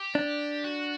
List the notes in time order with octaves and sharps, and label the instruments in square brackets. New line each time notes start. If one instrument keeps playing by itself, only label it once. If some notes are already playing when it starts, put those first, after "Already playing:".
Already playing: [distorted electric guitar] G4
[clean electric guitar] D4
[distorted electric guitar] F#4